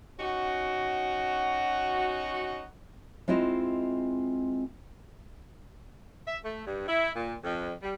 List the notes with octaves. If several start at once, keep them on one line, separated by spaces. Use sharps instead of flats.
C#4 D#4 F#4
G#3 C4 E4 F4 D#5
E5
A3
G2
E4
A#2
F2
G3